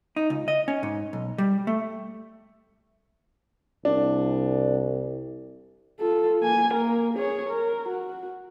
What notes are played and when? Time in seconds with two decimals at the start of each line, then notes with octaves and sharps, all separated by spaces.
0.16 D#4
0.30 C#2
0.48 D#5
0.68 C#4
0.83 G#2
1.13 B1
1.38 G3
1.67 A3
3.85 C2 D4
6.00 F4 A4
6.41 A#3 G#5
6.74 A#3 A#4
7.14 G#4 C#5
7.50 A#4
7.89 F#4